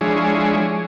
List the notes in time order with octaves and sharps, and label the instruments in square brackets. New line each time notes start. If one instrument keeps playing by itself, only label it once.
[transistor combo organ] F3 G#3 D4 E4 G#4 C#5